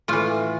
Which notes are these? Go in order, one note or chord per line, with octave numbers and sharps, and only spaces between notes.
A2 E3 F4